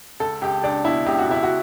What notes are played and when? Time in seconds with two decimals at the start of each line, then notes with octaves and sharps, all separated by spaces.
0.20 C#2 A4
0.41 C#2 G4
0.63 C#2 D4
0.85 B2 E4
1.06 C#2 G4
1.19 F#4
1.28 C#2 E4
1.43 F#4